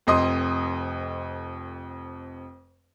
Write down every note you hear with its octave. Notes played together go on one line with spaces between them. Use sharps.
F1 F2 D#5 C6 D#6